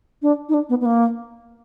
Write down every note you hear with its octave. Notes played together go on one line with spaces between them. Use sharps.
D4
D#4
D4
B3
B3
A#3